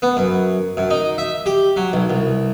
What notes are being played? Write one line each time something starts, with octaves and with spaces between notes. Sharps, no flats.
B3
F#2
F#2
D#4
E5
G4
F#3
B1
C2